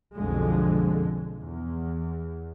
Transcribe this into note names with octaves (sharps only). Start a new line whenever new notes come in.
B1 F2 D3 G#3
E2